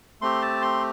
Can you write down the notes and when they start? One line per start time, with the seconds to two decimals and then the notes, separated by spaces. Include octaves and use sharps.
0.21 A3 C4 G4 C6
0.42 A5
0.62 C6